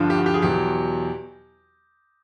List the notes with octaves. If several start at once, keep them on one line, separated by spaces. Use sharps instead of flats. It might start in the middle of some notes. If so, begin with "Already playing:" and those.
Already playing: G2 D3 F3
G4
F#4
G4
G#4
E2 B2 F#3 G4